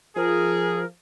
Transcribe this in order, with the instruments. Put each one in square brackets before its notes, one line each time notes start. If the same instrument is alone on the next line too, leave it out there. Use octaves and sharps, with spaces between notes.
[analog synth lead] F3 [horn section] G#4 [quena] A#4